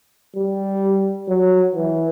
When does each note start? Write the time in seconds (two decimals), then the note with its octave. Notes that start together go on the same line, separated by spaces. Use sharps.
0.36 G3
1.29 F#3
1.75 E3